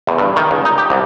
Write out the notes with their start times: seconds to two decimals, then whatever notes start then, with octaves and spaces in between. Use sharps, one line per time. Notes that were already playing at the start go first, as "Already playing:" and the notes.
0.07 E2
0.18 G2
0.36 D#3
0.51 C#2
0.65 D#4
0.78 G4
0.90 C2